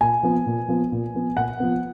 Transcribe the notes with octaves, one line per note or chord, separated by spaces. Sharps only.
A#2 G#5
F3 B3
A#2
F3 B3
A#2
F3 B3
A#2 F#5
F3 B3